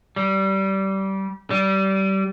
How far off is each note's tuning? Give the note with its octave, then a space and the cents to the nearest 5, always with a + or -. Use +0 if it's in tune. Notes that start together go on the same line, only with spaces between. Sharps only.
G3 -20
G3 -25